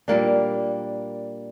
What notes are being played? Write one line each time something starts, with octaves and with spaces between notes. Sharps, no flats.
A#2 G3 A#3 D4